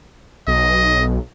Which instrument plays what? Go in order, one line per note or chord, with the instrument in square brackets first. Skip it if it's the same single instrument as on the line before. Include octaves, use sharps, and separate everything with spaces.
[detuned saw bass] B1 [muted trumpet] D#5